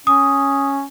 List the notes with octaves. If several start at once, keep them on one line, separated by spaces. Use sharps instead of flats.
C#4 D#6